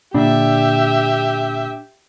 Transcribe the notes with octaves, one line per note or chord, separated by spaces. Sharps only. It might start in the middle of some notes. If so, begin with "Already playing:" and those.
A#2 D3 D4 G4 D5 E5